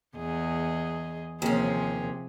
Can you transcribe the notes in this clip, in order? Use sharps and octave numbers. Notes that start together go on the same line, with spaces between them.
E2 G#4 D#5
D#2 C3 F3 C#4 G#4